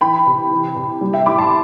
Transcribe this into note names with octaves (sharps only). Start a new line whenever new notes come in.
E3 G5 B5
C3
E3
C3
G3
E5 G5
A2 B5 D6
A5 C6